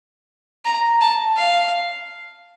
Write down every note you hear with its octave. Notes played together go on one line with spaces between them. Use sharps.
A#5
A5
F5